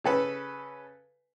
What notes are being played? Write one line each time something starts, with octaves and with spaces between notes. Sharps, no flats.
C#3 A4 B4